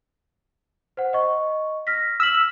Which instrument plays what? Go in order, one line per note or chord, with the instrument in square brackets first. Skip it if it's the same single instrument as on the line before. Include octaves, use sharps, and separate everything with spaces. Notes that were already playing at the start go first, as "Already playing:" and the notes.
[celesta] C5 F#5
D#5 C#6
F6 A#6 B6
[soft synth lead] E6 [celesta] F6 B6 F#7